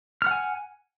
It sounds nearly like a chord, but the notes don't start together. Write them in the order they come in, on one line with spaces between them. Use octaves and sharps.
F6 F#5 G#5